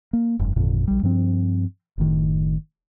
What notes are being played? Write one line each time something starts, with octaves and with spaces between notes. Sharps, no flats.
A#3
F1 G2
G#1 F2 A#2 D3
A#1 G3
G2 F3 C4
F#1 A2 D#3